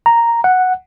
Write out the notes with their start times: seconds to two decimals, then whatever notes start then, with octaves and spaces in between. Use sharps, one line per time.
0.06 A#5
0.44 F#5